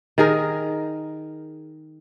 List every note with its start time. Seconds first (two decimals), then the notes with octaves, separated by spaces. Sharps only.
0.18 D#3 G#4 A#4